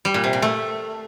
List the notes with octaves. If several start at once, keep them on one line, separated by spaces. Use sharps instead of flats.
G3
A#2
C3
A#2
A3